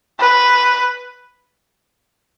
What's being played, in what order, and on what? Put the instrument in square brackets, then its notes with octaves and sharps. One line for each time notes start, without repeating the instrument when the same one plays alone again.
[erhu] B4